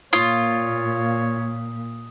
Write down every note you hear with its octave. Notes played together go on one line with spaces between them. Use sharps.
A#2 F4 C#5 D#6